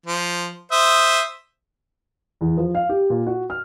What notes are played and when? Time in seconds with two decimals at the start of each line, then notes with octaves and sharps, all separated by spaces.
0.06 F3
0.72 C5 E5 D#6
2.41 E2
2.57 F3
2.75 F5
2.89 G4
3.10 A#2
3.27 F#4
3.50 F6